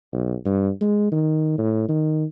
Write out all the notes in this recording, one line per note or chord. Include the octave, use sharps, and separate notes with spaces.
B1
G2
G#3
D#3
A2
D#3